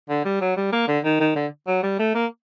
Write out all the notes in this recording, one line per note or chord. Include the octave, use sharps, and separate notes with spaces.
D3
G3
F#3
G3
A#3
D3
D#3
D#3
D3
F#3
G3
A3
A#3